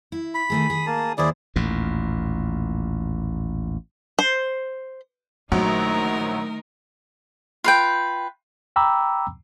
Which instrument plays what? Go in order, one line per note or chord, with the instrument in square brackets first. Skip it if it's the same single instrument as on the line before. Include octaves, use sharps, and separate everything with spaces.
[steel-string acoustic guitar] E4
[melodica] B5
[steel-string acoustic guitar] D#3 A3 G#4
G#4
[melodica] A#3 A5
[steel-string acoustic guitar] D#2 C5 [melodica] E4 G#4 D5
[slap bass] A1 D#2 A#2
[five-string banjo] C5
[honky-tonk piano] A#1 F#3 [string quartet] D#3 D#4 A#4 [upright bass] A3
[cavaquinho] F4 B4 G5
[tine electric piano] G5 A#5 B5 D6 E6